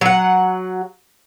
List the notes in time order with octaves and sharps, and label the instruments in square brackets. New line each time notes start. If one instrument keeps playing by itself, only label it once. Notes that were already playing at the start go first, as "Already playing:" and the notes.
[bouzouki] F#3 F#5